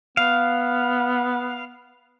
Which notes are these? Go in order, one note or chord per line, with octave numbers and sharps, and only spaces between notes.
B3 F5